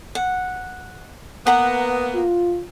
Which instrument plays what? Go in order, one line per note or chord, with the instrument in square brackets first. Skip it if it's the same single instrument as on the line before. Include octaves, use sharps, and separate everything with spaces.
[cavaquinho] F#5
[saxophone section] A#3 B3 [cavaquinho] F#5 A#5
[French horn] F4